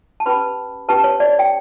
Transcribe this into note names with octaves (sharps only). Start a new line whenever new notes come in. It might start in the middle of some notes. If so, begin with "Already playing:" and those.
A5
C#4 G4 B4 B5
C#4 G4 B4 A5
C#5
D5
G5